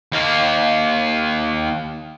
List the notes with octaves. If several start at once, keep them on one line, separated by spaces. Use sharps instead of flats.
D#2 A#3